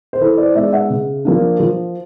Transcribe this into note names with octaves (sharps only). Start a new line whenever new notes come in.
C5
E3 A4 B4
C5 D5
G#3 B3 D#4 D5 E5
E5 F#5
C#3
F3 A#3 D4
F3